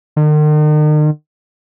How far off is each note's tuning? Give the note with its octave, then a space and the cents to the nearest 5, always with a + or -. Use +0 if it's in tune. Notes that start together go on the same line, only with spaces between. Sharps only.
D#3 -45